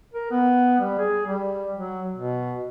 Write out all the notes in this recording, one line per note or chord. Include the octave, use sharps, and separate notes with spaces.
A#4
B3
G3
G#4
G3
F#3
B2